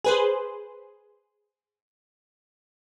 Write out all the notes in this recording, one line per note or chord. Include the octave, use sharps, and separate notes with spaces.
G#4 B4 C5